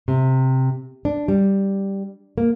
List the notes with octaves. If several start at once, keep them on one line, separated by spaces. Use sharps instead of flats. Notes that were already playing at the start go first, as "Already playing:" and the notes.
C3
D4
G3
A#3